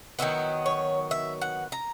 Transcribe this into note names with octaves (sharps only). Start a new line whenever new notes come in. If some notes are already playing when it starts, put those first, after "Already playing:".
D#3 F#3 B3 E4
C#5
E5
F#5
A#5